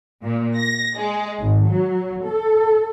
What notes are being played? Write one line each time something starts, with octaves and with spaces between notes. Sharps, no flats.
A#2
A#6
G#3
G#1
F#3
A4